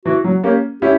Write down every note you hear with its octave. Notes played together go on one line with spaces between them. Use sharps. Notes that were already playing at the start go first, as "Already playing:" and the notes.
E3 F#4
F#3
A#3 C#4 G4
C#4 E4 G4